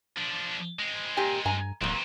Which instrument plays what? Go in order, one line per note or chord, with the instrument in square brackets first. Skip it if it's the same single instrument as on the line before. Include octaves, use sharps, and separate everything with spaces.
[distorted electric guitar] F3 D4
G#3 C4
[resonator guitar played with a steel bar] A#2 G4 G#5
[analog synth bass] G2 [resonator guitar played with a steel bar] G#5 A#5
[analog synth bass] D1 [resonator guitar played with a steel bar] A#2 F#3 [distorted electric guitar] E3 C4